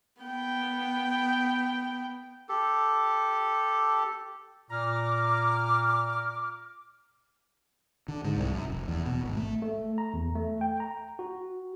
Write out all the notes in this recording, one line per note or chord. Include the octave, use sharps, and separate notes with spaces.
B3 G5
G4 A4
A#2 A#5 D6 F6
D3
G#2
C2
F#2
F1
E2
B2
G#1
A3
A3
A#5
E2
A3
G5
A#5
F#4